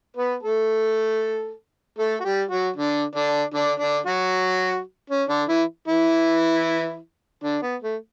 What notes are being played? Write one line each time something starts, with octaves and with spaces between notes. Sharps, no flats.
B3 B4
A3 A4
A3 A4
F#4
G3 G4
F#3 F#4
D3 D4
D3 D4
D3 D4
D3 D4
F#3 F#4
C#4
D3 D4
E3 E4
E3 E4
D3 D4
B3
A3